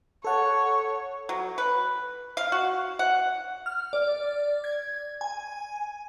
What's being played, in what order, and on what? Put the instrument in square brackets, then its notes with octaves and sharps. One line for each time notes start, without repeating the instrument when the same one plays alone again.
[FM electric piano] A4 F#5 A5 [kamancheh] C#5
[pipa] F#3
B4
F5
F#4
F#5
[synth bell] F6
D5
G#6
G#5